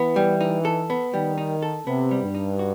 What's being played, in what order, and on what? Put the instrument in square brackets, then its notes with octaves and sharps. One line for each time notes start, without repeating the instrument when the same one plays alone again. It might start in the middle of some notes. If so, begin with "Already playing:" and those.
Already playing: [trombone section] E3 [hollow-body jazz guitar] B3
[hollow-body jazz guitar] G3
D#4
A4
B3
[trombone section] D#3 [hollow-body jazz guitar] G3
[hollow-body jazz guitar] D#4
A4
[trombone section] C3 [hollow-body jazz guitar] B3
[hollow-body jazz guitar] G3
[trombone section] G2
[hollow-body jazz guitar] D#4
F#4